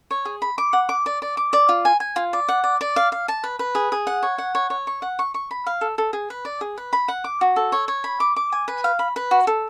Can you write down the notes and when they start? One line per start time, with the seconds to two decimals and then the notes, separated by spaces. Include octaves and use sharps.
0.11 C#5
0.25 G#4
0.42 B5
0.58 D6
0.73 F#5
0.89 D6
1.06 D5
1.22 D5
1.37 D6
1.53 D5
1.69 F4
1.85 G#5
2.00 G#5
2.16 F4
2.33 D5
2.49 F#5
2.64 D5
2.81 D5
2.96 F5
3.12 F5
3.28 A5
3.44 B4
3.59 B4
3.75 G#4
3.92 G#4
4.07 F#5
4.23 C#5
4.38 F#5
4.55 C#5
4.70 C#5
4.87 C#6
5.02 F#5
5.19 C#6
5.34 C#6
5.51 B5
5.66 F5
5.81 A4
5.98 A4
6.13 G#4
6.30 B4
6.45 D5
6.61 G#4
6.78 B4
6.93 B5
7.08 F#5
7.24 D6
7.41 F#4
7.56 A4
7.72 C#5
7.88 C#5
8.04 B5
8.20 D6
8.36 D6
8.52 G#5
8.68 B4
8.84 F5
8.99 B5
9.16 B4
9.31 F#4
9.47 A4